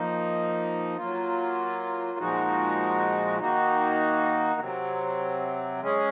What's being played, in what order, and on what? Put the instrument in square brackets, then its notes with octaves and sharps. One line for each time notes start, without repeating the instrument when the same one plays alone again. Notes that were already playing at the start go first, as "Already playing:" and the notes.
Already playing: [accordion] F3 A#3 D#4
F#3 A#3 F4
A#2 F3 G#3 D#4 F#4
D#3 A#3 D#4 F#4
C3 F#3 C4
G#3 C#4 G#4